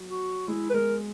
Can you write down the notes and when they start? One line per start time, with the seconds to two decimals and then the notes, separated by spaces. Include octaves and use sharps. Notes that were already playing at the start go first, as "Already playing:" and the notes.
Already playing: F#3
0.10 F#4
0.48 G#3 E4
0.70 B4
0.74 G#3 A#4